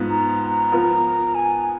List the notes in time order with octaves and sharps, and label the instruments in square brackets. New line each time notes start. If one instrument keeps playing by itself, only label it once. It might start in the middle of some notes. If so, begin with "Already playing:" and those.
Already playing: [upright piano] G#2 F3 B3
[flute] A#5
[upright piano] F3 B3 F4 A#4
[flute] G#5